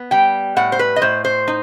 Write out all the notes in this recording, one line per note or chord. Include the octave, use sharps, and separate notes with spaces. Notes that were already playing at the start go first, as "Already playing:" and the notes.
Already playing: B3
G3 G5
A2 F#5
C5
B4
D#5
A2 C5
C5
D#4